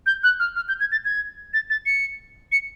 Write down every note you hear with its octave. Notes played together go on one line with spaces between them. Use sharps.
G6
F#6
F6
F6
G6
G#6
A6
G#6
A6
A6
C#7
C#7